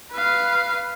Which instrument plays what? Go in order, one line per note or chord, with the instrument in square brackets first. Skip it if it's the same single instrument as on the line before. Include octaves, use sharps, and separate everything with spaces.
[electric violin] B4 F5